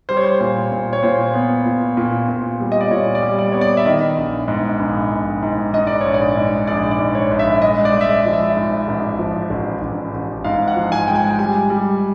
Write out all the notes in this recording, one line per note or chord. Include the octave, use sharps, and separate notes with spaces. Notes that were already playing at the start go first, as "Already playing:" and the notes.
G3 C5
C#5
C5
A#2
A#2
C#5
A#2 C5
B3
A#2
A#2
A#2
G3
D#5
D5
A#2 C#5
D5
G3
D5
B3 C#5
D5
E5
D#3 D#5
A#1
G#2
A#1
A#1
G#2
G#2 D#5
D5
A#1 C#5
D5
G#2
A#1 D5
D5
G#2
C#5
A#1
E5
G#3 D#5
D5
G#3
E5
D#5
F3
E5
G#2
A1
F3
A1
A1
A1
G#2 F5
F#5
F3
G#5
G#3 G5
G#5
G5
G3 G#5
G3